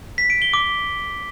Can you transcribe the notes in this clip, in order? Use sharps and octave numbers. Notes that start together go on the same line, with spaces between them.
B6
D7
G7
D6